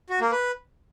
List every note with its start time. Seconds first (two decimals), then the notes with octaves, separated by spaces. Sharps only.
0.10 F#4
0.21 A#3
0.32 B4